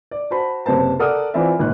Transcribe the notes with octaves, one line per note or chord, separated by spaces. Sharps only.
D5
F#4 C5 A5 B5
F#1 C3 B4 C5 A5
A4 A#4 D5 F#5 D#6 F6
E3 C4 F4 D5 E5
G#1 A#2 F#6